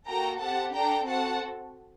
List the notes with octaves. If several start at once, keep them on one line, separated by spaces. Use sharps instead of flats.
A#3 F#4 A4 G5 A#5
C4 G4 F#5 A5
D4 A4 G5 A#5
C4 F#4 A4 F#5 A5